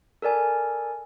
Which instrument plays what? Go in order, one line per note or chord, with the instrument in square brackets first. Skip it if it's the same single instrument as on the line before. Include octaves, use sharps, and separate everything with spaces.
[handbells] A4 A#4 D5 G#5